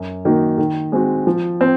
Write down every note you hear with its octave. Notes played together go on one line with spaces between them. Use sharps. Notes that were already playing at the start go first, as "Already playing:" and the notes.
Already playing: F#2
D#3 A#3 D#4 F#4
D#3
G#3 C4 F#4
F3
C4